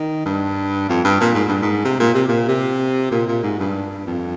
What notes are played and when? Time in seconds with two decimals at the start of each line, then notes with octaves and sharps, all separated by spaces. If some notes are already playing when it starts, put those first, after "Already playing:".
Already playing: D#3
0.25 G2
0.89 F2
1.05 G2
1.21 A#2
1.34 G#2
1.48 G2
1.62 G#2
1.85 C3
2.00 A#2
2.14 C3
2.28 A#2
2.48 C3
3.12 A#2
3.28 A#2
3.43 G#2
3.59 G2
4.07 F2